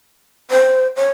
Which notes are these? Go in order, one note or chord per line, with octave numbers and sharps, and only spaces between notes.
C5
C#5